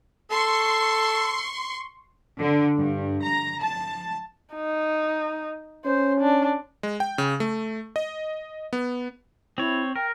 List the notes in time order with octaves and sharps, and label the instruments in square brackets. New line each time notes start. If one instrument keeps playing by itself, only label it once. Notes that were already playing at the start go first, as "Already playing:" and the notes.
[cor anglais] A4 [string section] C6 C#6
[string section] D3
G2
A#5
A5
[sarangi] D#4
[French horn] C#4 [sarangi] C5
[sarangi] D4
[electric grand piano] G#3
G5
C#3
A3
D#5
B3
[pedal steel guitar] C4 C#5 [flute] E4
[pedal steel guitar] A#4 [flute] G5